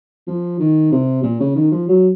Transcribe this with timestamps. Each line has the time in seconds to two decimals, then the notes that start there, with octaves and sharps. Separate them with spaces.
0.27 F3
0.59 D#3
0.91 C3
1.23 A#2
1.40 C#3
1.55 D#3
1.71 F3
1.88 F#3